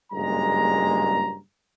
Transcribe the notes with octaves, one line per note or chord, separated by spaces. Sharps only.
F#1 G2 A#2 G#3 A#5